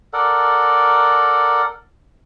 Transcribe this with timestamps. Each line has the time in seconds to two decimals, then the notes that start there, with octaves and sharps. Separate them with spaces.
0.13 A4 A#4 D5 F#5